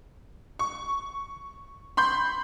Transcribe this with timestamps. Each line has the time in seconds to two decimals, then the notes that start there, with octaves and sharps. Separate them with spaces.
0.59 C#6
1.97 B5 C6 G6